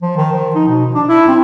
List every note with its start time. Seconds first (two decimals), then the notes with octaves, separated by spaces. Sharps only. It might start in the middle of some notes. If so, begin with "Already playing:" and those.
0.02 F3
0.17 D#3
0.32 F3
0.55 D#4
0.68 B2
0.95 D4
1.09 E4
1.28 C4